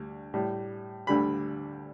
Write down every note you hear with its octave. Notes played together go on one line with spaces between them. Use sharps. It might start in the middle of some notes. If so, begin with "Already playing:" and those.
Already playing: D2 D3 G3
A2 G3
D2 D3 G3 B5